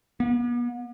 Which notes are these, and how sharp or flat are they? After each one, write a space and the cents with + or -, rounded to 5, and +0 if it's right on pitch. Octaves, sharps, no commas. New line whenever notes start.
B3 -40